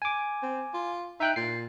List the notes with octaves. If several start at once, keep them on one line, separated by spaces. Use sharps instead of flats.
G#5 D6
C4
F4
D#4 E5 G5 F#6
A#2 C7